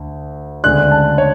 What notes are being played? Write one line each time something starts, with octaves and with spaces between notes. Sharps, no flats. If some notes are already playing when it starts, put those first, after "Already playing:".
Already playing: D2
D2 C#3 G#3 D4 F#6
A5
C#5